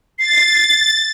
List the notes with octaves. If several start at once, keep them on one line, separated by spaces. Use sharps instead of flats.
A6 C7